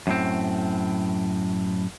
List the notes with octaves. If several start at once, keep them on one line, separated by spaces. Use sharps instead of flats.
F#2 A2 C4